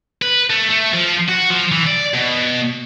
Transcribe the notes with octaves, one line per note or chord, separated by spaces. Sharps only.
B4
A3
A3
F3
F#4
F3
E3
D5
B2